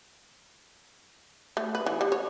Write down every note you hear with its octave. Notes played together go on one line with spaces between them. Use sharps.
A3
B4
E3
G3
C#5